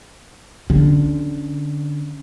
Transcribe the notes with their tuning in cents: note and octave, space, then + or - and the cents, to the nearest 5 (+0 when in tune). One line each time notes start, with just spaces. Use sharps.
D3 +0 C#4 +0